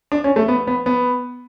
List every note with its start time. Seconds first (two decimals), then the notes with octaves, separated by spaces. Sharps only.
0.12 D4
0.24 C#4
0.36 A3
0.48 B3
0.67 B3
0.86 B3